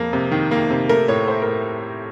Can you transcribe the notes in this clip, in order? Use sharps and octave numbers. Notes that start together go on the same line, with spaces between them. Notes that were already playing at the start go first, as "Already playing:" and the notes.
Already playing: F2 A#3
C3
D#3
A#3
C3
A3 A#4
A2 C#5
A3 C5
A#4
A2